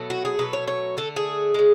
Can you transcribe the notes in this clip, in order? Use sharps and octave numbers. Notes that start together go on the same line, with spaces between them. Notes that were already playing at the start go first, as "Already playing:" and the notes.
Already playing: B2 F#3 A3
F#4
G#4
B2 F#3 A3 B4
C#5
C#5
D3 A3 A4
G#4
C#3 G#3